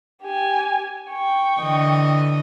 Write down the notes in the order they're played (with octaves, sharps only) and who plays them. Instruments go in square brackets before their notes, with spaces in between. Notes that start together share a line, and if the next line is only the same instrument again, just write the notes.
[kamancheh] G4 G#5
G5 C#6
[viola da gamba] D3 E3 D#5